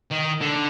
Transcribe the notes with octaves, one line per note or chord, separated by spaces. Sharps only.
D#3
D3